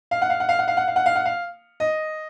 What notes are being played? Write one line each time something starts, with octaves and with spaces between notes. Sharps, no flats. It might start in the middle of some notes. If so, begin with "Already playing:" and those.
F5
F#5
F5
F#5
F5
F#5
F5
F#5
F5
F#5
F5
F#5
F5
D#5